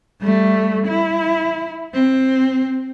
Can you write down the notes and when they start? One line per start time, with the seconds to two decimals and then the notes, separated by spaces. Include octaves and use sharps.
0.21 G3 A3
0.87 E4
1.94 C4